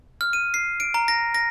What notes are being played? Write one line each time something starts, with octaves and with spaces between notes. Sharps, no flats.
F6
D#7
C7
D7
A#5
A#6
A#6